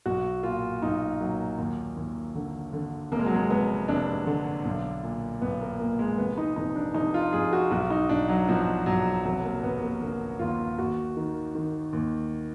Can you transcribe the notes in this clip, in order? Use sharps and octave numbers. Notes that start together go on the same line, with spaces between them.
B1 F#4
A#2 F4
B1 D#4
A#2 F#3
D#2
D#2
D3
D3
F1 A#3
G#3
F#3
G#3
F1 B3
F1 D4
D3
B1
A#2
B1 B3
A#3
A#2 A#3
G#3
F1 B3
D#4
F1 D#4
D4
F1 D#4
F4
F2 G#4
F#4
B1 F#4
D#4
B1 D4
F#3
B2 F3
B1 F#3
F1 F#3
A#3
F1 B3
A#3
D3 A#3
D#2 F4
D#2 F#4
D#3
D#3
D#2